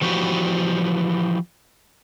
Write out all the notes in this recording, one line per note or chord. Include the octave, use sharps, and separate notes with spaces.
E3 F3 F#4 G4 B4